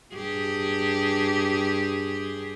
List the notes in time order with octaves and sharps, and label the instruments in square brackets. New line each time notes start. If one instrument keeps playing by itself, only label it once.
[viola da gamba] G2 G4 G#4